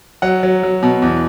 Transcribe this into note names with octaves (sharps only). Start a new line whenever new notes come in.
F#3 F#5
F#3
F#3
B2
E2